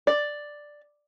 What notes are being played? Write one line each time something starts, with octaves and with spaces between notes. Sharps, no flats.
D5